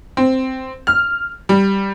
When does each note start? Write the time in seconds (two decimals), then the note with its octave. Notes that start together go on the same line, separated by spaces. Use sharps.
0.17 C4
0.87 F6
1.49 G3